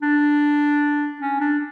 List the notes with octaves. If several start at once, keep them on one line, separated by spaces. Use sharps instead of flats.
D4
C#4
D4